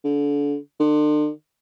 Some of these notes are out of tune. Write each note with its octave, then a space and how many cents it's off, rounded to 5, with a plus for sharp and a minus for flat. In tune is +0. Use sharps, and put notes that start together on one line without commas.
D3 -30
D3 +35